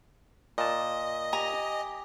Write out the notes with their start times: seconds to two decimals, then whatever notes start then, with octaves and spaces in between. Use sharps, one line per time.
0.58 A#2 D#5 A5
1.33 G4 G#5 A#5